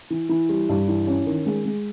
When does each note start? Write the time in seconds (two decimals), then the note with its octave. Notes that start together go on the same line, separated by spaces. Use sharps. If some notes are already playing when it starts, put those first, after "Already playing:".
0.10 E3
0.29 E3
0.49 G3
0.69 G2
0.88 E3
1.07 C#4
1.27 D#3
1.46 G#3
1.65 G#3